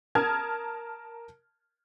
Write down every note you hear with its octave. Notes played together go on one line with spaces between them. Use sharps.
A#4 A5 D#6 F6 G#6